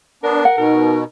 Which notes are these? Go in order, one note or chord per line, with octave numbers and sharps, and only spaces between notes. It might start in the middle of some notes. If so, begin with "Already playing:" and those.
B3 D4 A#4
F#5
B2 D#4 A#4